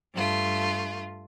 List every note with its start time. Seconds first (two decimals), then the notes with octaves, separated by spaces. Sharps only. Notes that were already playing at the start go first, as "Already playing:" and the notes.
0.14 G2 A3 F4